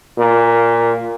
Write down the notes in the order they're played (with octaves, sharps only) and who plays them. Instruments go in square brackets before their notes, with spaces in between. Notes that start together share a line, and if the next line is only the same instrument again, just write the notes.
[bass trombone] A#2